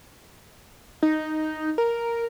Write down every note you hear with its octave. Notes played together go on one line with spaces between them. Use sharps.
D#4
A#4